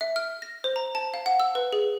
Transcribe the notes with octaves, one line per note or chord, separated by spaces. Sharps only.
E5
F6
A#6
C5
A#5
A5
F5
F#5
E6
B4
G#4